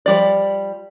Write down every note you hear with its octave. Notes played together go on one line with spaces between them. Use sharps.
F3 G3 D5